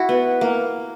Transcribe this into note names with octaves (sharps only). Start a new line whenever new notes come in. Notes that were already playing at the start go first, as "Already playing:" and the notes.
Already playing: E4 F#4
B3
A#3